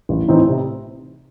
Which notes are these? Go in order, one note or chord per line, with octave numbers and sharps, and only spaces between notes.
A1
A2 E3 C4 D#4
C3